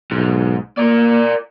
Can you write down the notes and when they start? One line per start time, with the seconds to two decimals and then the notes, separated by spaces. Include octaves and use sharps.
0.11 B1 G#2
0.78 A#3 A#4 D5